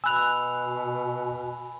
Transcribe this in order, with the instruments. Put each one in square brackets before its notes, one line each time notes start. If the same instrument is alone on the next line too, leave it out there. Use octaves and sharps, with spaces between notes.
[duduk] B2 [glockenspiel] G#5 B5 F7 [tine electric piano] E6 F#6